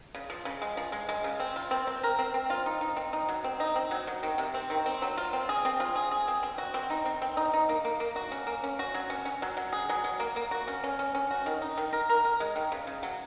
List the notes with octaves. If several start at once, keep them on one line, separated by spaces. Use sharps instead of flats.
C#3
F3
C#3
G#3
F3
G#3
G#3
C#3
C4
F4
C4
C4
A#4
C4
C4
F4
D#4
D#4
C4
D#4
F#3
C4
D#4
C4
F#3
F#3
D#3
C3
C4
D#3
C4
F#3
F4
C4
G#4
C4
F4
G#4
G#4
C4
C4
F#4
C4
D#4
C4
C4
D#4
D#4
A#3
A#3
A#3
F#4
C#4
A#3
C#4
F#4
F#3
C#4
C#4
F#3
F#3
G#4
F#3
F#3
A#3
A#3
F#4
C#4
C#4
C#4
C#4
F#4
D#3
D#4
D#3
A#4
A#4
A#4
G#3
D#3
C#3
C#3
F#3